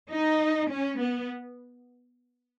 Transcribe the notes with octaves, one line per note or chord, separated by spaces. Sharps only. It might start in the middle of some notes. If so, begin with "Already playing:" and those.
D#4
C#4
B3